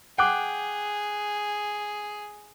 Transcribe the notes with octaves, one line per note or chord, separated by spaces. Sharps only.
G#4 F#5 G5 D6 F#6